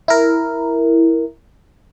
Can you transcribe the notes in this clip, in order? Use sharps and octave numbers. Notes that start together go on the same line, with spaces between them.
E4 A#4